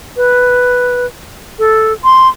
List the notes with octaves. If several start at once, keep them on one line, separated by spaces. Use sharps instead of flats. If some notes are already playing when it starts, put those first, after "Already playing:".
B4
A4
C6